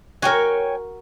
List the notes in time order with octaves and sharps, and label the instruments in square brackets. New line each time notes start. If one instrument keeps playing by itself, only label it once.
[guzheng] F#4 A#4 [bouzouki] C#5 G5 G#5